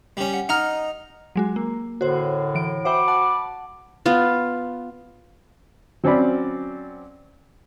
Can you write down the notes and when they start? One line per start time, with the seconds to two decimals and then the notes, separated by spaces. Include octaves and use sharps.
0.17 G3 C#4
0.34 F#5
0.49 D#4 F#5 A#5 F6
1.36 F#3 G#3 F#4
1.56 A#3
2.01 F#2 A2 D3 F#4 C5
2.55 E3 D7
2.85 F#4 C5 E5 G5 B5 D6
3.08 F#5 A5
4.06 B3 F4
6.04 F#3 C4 C#4 D5 B5